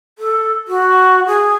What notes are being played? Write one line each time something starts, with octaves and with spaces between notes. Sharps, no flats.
A4
F#4
G#4